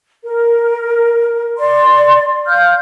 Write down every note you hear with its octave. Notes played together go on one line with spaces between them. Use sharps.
A#4
D5 C6
F5 F6 G6